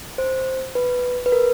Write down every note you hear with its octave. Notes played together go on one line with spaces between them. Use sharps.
C5
B4
B4
A#4